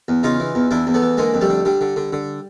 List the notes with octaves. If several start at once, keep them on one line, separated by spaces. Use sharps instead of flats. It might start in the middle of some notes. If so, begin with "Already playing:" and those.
E2
C#3 D#4 F4
E3
E2
E2 D4 E4
E2
A3 B3
E3
D3 G#3 A#3
F2
G3 A3
D3
D3 G3
D3
D3
D3